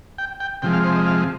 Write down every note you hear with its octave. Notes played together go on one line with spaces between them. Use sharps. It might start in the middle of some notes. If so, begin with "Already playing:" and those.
G5
G5
C3 F3 G#3 G5
F5
C5
D#5
F5